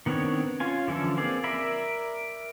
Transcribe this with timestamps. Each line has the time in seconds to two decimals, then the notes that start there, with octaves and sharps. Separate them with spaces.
0.06 D#3 B3 C4 D4 C#5
0.60 C#4 F4 G#5
0.88 D3 E3 F3 C#4 A4
1.17 A#3 C4 G#4 D5
1.44 A#4 D5 E5 B5